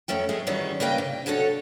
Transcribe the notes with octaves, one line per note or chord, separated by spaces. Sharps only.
F2 F#3 A3 C#4 G5
G#3 A3 G#4
D#3 E3 F#3 G3 C#4
C#3 G3 A#3 B4 D#5 G5
C3
D2 D3 F#4 A4 C#5